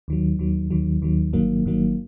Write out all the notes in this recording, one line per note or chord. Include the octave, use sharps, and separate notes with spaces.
D#2 D#3 F#3
D#2 D#3 F#3
D#2 D#3 F#3
D#2 D#3 F#3
G1 G2 D#3 F#3 A#3
G1 G2 D#3 F#3 A#3